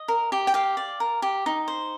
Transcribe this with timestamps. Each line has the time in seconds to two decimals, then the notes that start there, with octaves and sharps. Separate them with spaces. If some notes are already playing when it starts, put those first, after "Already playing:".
Already playing: D#5
0.08 A#4
0.32 G4
0.47 G5
0.54 G4 F5
0.77 D5
1.00 A#4
1.22 G4
1.46 D#4
1.68 C5